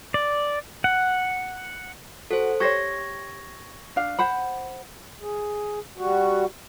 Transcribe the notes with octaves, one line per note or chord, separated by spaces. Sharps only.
D5
F#5
F#4 A4 C5
G4 C5 C#5 C#6 G#6 A#6
D4 F5
C5 F#5 B5
G#4
G3 F#4